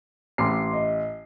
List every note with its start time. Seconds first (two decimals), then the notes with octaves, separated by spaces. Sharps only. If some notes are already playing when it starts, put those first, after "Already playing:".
0.38 A1 C6 D6 C7
0.73 D#5